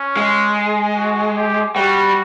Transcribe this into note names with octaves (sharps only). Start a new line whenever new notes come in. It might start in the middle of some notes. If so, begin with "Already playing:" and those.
Already playing: C#4
G#3
F#4
G4
G3 F#4